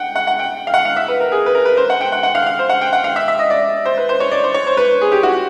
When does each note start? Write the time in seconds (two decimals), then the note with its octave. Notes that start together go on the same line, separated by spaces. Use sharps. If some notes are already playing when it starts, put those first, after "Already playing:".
Already playing: F#5 G5
0.16 F#5
0.27 F#5
0.39 G5
0.67 F5
0.74 F#5
0.85 F5
0.97 E5
1.08 B4
1.20 A#4
1.32 G#4
1.46 B4
1.55 A#4
1.66 B4
1.77 C5
1.90 F#5
2.01 G5
2.12 F#5
2.23 F#5
2.35 F5
2.46 F5
2.59 C5
2.70 F#5
2.81 G5
2.93 F#5
3.04 F5
3.16 E5
3.28 E5
3.39 D#5
3.50 D5
3.85 C5
3.98 B4
4.09 C5
4.20 C#5
4.32 D5
4.44 C5
4.54 C#5
4.67 C5
4.77 B4
5.01 G#4
5.12 G4
5.23 F#4